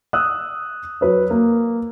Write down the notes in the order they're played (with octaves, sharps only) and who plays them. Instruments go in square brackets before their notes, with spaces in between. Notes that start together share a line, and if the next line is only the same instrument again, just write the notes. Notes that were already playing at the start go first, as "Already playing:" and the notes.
[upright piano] D#6 E6 F#6
F#3 B4 C#5
A#3